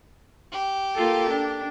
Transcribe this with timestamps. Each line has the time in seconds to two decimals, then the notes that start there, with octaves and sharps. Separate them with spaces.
0.52 G4
0.95 A#3 F4 A4
1.30 D4